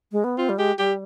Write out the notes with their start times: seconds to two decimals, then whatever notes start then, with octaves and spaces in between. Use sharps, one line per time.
0.12 G#3
0.24 B3
0.37 C4 F4
0.49 G3
0.58 G#3 G4
0.78 G3 G4